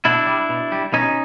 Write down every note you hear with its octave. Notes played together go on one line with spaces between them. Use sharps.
B2 D4 E4
G3
B2
G3
B2 C#4 D#4